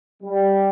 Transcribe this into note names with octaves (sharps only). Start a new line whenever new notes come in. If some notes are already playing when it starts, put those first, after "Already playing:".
G3